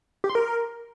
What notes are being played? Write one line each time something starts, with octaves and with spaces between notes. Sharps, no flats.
G4
C6
A#4